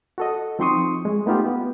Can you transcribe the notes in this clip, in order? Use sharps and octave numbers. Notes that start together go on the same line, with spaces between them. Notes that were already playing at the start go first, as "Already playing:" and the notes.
F#4 A4 D#5
F3 C4 D#4 C6 C#6 D#6
G#3
A3 B3 D#4 F4 G4
B3